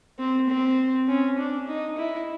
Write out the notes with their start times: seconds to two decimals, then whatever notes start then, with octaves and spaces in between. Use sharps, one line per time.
0.19 C4
0.49 C4
1.08 C#4
1.38 D4
1.68 D#4
1.97 E4